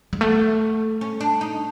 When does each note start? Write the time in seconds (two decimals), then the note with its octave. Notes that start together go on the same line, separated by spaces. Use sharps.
0.13 G#3
0.21 A3 B3
1.01 C#4
1.20 D4
1.41 D#4